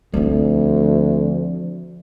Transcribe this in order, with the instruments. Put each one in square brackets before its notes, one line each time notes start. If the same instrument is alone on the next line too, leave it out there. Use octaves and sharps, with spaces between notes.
[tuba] D2 [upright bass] F3 C4